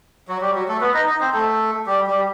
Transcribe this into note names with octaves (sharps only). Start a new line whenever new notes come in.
F#3 F#4
G3 G4
F#3 F#4
A3 A4
B3 B4
D#4 D#5
D#4 D#5
C4 C5
A3 A4
G3 G4
G3 G4